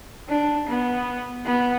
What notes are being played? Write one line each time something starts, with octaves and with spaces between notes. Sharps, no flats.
D4
B3
B3